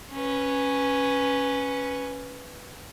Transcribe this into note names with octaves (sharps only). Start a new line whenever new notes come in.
C#4 B4